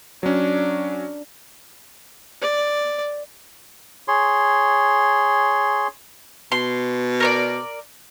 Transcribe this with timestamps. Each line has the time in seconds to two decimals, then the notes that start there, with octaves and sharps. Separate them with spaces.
0.23 F#3 C#4 D4
2.41 D5
4.08 G#4 C#5 C6
6.52 B2 C6
7.20 A#4 C#5 D5